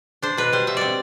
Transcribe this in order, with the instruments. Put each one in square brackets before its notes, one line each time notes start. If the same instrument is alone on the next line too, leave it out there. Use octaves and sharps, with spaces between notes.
[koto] D4 C5
B2 B4
G3 C5
B2 E5
C4 D5